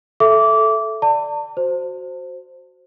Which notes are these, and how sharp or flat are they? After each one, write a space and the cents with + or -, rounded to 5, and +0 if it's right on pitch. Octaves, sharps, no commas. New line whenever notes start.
A4 -10 E5 +10 D6 -20
D5 +0 A5 +40
F#4 +0 C5 +0